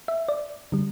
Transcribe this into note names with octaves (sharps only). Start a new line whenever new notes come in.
E5
D5
D3 G3